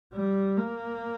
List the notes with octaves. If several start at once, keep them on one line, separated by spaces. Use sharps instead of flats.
G3
A#3